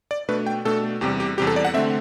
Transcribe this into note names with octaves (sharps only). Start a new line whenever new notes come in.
D5
B2 A3 D4 B4
G5
B2 A3 D4 A4
E2 C3 G3 G4
G4
E2 C3 G3 G4
A4
D5
F#5
D3 A3 C4 E5